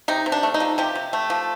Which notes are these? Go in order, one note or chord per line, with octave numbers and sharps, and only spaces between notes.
C3 D#4
C3
D4
A3
D#4
F3
C3 G4
C3
A3
F3